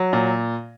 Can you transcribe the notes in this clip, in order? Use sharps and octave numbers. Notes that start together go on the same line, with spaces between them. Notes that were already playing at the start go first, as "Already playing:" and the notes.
Already playing: F#3
A#2